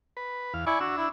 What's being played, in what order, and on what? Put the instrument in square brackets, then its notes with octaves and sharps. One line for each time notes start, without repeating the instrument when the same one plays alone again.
[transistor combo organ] B4
E2 F5
[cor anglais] E4 [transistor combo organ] D5 G#5 C#6
[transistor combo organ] D4 E6 [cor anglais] F#4
[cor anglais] E4